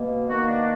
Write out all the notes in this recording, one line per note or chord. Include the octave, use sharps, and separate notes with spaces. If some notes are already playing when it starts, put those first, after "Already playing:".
Already playing: B2 A#3
D#3 A#3 F#4
D4